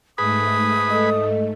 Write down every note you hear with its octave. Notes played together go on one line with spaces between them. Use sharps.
G#2 A3 G#4 B4 B5 D#6
A4 D#5